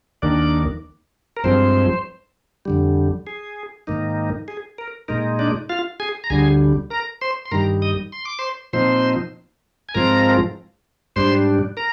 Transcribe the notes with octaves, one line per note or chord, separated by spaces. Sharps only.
D#2 D#3 A#3 D4 D5
A#4
G2 F3 G#3 C4 C5
F2 D3 G3
G#4
G#2 D#3 A#3 D#4
G#4
A#4
A#2 G#3 D#4 A#4
D4 D5
F4 F5
G#4 G#5
A#5
D2 D3 G3 G#4 G#5
A#4 A#5
C5 C6
C6
G2 D#3 G3 A#4 A#5
D#5 D#6
C6
D6
C5 C6
A#2 F3 C4 D#4 C5 C6
G#5
G#2 F3 G#3 C4 F4 A#4 A#5
G#2 G3 D4 C5 C6
A#4 A#5